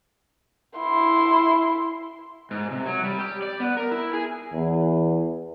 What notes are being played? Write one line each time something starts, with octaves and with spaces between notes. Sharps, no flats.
E4 C6
G#2
C3
F#3
G3
G4
D5
B3
A#4
E4
G#4
E2